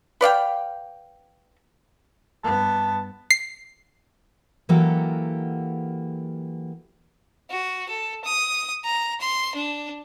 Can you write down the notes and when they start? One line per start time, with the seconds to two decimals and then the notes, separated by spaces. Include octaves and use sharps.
0.21 B4 D5 F5 G5
2.44 G2 B3 A5
3.30 C7
4.69 E3 F#3 A#3 G4 A4 F#5
7.50 F#4
7.89 A4
8.25 D#6
8.84 A#5
9.21 C6
9.55 D4